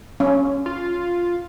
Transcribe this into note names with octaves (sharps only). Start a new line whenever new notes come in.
C#4
F4